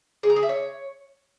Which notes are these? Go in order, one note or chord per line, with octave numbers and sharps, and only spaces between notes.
G#4
A#5
G#4
E5
C#5